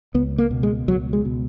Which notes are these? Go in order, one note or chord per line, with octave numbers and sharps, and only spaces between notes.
C#2 B3
A#3
B2
G#3
C#2 F#3
G#3
B2